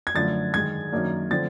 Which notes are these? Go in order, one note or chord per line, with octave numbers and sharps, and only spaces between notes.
G#6
F#2 D3 F3 A3 A6
G#2 D#3 G#3 G#6
F#2 D#3 F#3 A#3 D4
D3 F3 A3 C4 A6